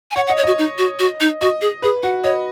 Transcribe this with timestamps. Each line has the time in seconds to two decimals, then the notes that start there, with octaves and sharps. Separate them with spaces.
0.11 G#5
0.16 C#5 F#5
0.27 F#5
0.30 D#5
0.37 C#5
0.43 F#4 D#5
0.58 D#4
0.78 F#4
0.99 F#4
1.20 D#4
1.41 F#4 D#5
1.61 G#4
1.82 G#4 B4
2.03 F#4 F#5
2.24 C#5 D#5